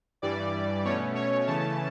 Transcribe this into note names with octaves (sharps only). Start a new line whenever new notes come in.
G2 E3 G3 D5
B2 A3 C#4 C#5
C#5
C#3 E3 A3 C#4 A5